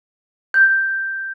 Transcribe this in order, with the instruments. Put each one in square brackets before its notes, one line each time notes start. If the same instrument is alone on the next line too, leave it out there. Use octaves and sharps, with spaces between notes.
[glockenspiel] G6